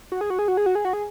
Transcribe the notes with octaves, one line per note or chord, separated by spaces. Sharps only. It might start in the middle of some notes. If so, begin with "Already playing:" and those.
F#4
G#4
F#4
G#4
F#4
G#4
F#4
G#4
F#4
G#4